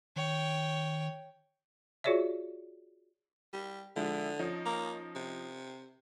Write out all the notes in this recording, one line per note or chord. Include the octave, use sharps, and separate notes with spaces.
D#3 C#5 G5
F4 F#4 G#4 C#5 D5 E5
G3
D3 F3 G#3 E4
F3 C#4 D#4
A#3
C3